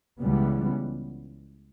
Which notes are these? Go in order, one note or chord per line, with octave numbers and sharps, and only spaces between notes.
C#2 C#3 E3 G3 B3